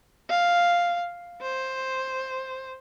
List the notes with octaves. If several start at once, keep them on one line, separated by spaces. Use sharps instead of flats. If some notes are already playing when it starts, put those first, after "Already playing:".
F5
C5